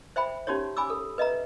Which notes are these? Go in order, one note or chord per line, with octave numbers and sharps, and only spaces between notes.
C5 E5 G5 B5
C#4 D#4 F#4 G4 C#5
G#5 B5 D6 E6
A4
B4 D#5 E5 A#5